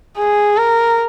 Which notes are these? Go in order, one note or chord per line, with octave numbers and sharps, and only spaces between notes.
G#4
A#4